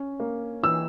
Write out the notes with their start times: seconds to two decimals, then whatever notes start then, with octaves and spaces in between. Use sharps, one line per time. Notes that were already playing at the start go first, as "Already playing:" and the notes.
Already playing: C#4
0.20 A#3
0.63 E3 E6